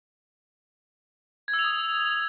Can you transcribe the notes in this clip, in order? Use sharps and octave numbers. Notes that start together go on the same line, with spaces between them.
G#6
E6
F7
D#6